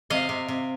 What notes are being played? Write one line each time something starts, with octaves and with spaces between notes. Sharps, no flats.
C3 D#5 F5
C3
C3